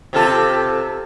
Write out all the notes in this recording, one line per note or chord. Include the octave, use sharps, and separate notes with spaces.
C3 F4 A4